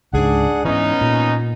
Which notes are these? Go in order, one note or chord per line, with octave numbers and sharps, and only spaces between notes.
C#2 G#2 D4 G#4 F#5
G#2 E3 B3 C#4 D#4
A#2